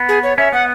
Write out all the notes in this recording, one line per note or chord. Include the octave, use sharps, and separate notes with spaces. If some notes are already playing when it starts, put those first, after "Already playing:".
Already playing: B3
G#4
C#5
C#4 E5
B3 F#5